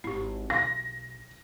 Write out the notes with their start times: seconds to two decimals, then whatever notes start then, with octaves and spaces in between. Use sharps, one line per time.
0.04 G#1 E4 G4
0.50 B1 F5 C6 A#6